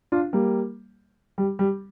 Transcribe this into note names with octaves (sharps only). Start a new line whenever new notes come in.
D4 F4
G3 A#3
G3
G3